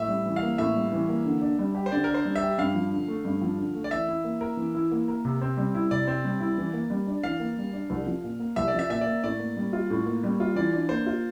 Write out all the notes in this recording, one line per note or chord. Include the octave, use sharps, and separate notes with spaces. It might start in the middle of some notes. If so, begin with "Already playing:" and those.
Already playing: A2 E5
G3
E3
F5
A#3
A2 E5
G3
E3
A#3
D3
D4
G3
G4
C5
D3 D5
A#4
D4
C5
G3
E5
G4
G2 F5
F3
D3
A3
G2
F3
D3
A3
D5
E3 E5
E4
A#3
A#4
E3
E4
A#3
A#4
C3
C4
G3
E4
C3 D5
C4
G3
E4
E3
A#3
G3
D4
E3 F5
A#3
G3
D4
C2
F3
A#2
A#3
C2 E5
D5
F3 E5
A#2 E5
A#3 D5
A2 D5
A#3
G3
F4
A2
A#3
G3
F4
E3 D5
D4
A#3 C5
F4